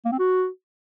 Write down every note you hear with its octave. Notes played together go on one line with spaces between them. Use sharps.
A#3
C4
F#4